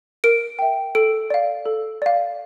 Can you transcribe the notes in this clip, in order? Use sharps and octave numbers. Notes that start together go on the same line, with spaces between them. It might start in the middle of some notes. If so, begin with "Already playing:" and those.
A#4 D7
E5 G5
A4 D7
D5 F5
A4
D5 F5